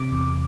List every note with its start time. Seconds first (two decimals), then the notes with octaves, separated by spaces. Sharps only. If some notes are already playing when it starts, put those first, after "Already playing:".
Already playing: C3 D6
0.12 E2